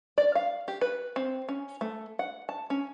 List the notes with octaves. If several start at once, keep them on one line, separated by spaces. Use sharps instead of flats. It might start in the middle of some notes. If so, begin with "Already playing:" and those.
D5
F5
G4
B4
C4
C#4
A3
F#5
A5
C#4